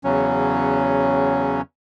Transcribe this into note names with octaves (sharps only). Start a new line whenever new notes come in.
E2 C#3 F#3 C#4